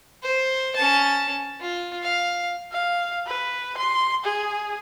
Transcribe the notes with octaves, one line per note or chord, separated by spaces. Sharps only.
C5
C#4 A5
F4
F5
F5
B4
C6
G#4